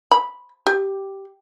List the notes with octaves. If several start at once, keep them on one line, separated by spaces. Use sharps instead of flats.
B5
G4